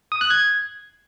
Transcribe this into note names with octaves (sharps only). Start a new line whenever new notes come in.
D#6
F#6
G#6